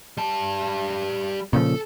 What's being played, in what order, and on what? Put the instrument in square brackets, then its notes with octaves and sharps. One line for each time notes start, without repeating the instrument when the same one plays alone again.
[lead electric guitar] G3 A5
[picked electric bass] A#2 C#3 F3 [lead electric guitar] A4